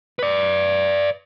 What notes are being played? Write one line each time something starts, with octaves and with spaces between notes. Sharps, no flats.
B4 D5